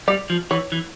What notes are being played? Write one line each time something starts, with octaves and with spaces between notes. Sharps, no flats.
G3 D5
F3
E3 C#5
E3